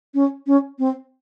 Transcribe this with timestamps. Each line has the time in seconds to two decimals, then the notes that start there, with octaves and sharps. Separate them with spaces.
0.14 C#4
0.47 C#4
0.79 C4